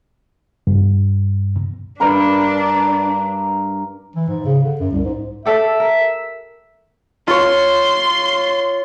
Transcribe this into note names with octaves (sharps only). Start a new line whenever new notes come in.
G2
G2 D4 A#4 B5
E3
G#2
C#3
D3
F#2
C2
G#2
G4 A4 D5 E5
A#4
F4 C#5 C6